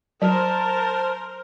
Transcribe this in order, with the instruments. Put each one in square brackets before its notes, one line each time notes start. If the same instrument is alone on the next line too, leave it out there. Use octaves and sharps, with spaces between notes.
[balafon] F#3 [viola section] A#4 C5 [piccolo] A5